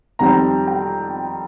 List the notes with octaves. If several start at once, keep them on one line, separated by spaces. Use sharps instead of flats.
F2 D#3 G3 C4 A#5
G5